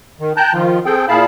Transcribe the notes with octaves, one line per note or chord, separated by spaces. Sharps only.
D#3
G5 A5 A#5 F#6 G6
D#3 F3 F4
C4 G#4 A4 G5
A#2 E4 G#4 F5 A5 B5